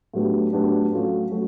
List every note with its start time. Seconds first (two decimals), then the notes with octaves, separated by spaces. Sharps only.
0.13 A2 F#3 B3 D4 G4
0.53 A2 F#3 B3 D4 G4
0.93 F#3 A3 C#4 F4
1.32 F#3 A3 C#4